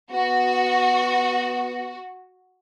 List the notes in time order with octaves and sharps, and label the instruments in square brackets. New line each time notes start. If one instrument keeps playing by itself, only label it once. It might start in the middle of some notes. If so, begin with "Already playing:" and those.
[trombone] B3 [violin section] F#4